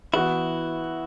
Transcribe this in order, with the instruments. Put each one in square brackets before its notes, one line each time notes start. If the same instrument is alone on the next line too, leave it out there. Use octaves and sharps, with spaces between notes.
[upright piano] E3 B3 F#4 [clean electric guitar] E4